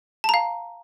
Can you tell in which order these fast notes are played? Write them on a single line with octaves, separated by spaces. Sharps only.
A5 A#5 F5